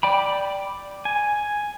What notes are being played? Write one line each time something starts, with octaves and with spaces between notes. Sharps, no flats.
D5 G5 B5
G#5